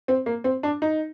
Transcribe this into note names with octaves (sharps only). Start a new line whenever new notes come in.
C4
A#3
C4
D4
D#4